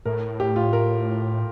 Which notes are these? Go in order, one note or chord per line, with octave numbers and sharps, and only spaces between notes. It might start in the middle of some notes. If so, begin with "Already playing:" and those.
A2 A#4
G4
F4
A#4